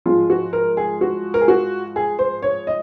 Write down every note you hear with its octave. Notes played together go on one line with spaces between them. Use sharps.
G#2 F3 G#3 F4
F#4
A#4
G#4
F#4
A#4
G#4
F#4
G#4
C5
C#5
D#5